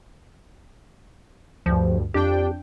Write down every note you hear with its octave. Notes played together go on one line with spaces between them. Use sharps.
D2 G2 F3
F2 D4 G4 G5